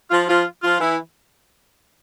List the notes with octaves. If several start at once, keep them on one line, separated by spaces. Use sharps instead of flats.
F3 F4
F3 F4
F3 F4
E3 E4